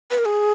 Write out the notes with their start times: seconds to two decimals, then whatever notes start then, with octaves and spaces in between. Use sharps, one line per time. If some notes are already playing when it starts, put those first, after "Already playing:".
0.11 B4
0.18 A#4
0.25 G#4